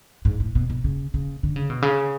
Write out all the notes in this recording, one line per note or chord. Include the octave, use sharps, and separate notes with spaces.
G#2
A2
B2
B2
C#3
C#3
D3
C#3
B2
C#3